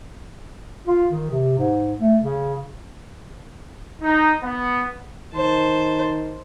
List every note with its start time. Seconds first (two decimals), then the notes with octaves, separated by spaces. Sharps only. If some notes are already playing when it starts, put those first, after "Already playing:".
0.87 F4
1.11 D#3
1.30 C3
1.58 G#2
2.00 A3
2.22 C#3
4.02 D#4
4.42 B3
5.34 D#3 C5 A5